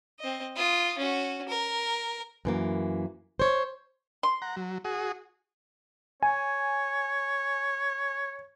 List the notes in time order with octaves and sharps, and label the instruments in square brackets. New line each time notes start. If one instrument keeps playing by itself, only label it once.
[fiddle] C4 D#5
F4 D#6
C#4 F#4
A#4
[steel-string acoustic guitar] F#2 E3 A#3
C5 C#5
[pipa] C6
[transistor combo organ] F#5 A#5
F#3
F#4 G#4 D#6
[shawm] C#5 [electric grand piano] G#5